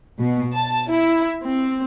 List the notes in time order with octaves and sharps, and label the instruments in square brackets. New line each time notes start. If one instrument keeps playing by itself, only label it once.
[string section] B2
A5
E4
C4